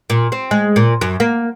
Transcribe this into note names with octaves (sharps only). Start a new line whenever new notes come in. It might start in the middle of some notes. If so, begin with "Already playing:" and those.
A#2
C4
G#3
A#2
F#2
A#3